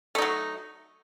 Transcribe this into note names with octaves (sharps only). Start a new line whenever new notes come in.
F#3 A3 D#4